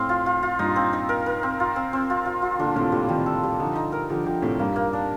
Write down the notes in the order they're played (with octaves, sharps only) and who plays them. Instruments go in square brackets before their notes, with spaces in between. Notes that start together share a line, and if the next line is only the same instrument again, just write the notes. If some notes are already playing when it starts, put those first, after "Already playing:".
Already playing: [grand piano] A2 [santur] C4 F5
[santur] F4
F4
F4
[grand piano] G2 A#2 [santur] D#4
[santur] C4
D#4
A#4
A#4
C4
F4
C4
C4
F4
F4
F4
[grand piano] A#2 D3 [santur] D4
[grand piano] A2 C3 [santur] D4
[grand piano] A#2 D3 [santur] G3
[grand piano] C3 D#3 [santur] G3
[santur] A4
G3
[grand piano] D3 F3 [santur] D#4
[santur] D#4
A#4
[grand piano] D3 F3 [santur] G4
[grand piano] D3 F3 [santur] G4
[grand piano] A2 C3 [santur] G4
[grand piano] G2 A#2 [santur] A#3
[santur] A#3
D4